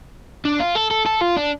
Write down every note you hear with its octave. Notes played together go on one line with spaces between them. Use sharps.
D4
F4
A4
A4
A4
F4
D4